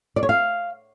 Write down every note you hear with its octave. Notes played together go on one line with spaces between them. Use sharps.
D5
C#5
F5